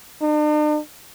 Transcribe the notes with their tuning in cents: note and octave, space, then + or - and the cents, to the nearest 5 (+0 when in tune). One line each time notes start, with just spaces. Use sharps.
D4 +45